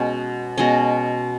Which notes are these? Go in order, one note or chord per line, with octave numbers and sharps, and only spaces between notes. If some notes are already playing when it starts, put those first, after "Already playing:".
Already playing: B2 G#3 C#4
B2 G#3 C#4 D#5